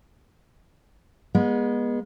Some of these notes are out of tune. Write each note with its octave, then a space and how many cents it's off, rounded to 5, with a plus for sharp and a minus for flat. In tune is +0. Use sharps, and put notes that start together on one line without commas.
G#3 -20 B3 -35